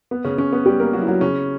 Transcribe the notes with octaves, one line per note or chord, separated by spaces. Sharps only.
B3
C#3 C#4
C#3 C#4
B3
G3 G4
A#3 A#4
F#3 F#4
E4
F#3 F#4
C#3 C#4